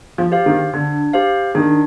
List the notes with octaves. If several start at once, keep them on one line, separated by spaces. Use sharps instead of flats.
F3
G4 C5 F5
D#3
D3 D4
G4 C5 F5
D#3 D4